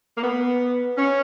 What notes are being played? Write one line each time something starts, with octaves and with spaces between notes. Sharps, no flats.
A#3
B3
C#4